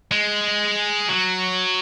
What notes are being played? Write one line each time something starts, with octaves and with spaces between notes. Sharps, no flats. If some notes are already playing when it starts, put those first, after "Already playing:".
G#3
F#3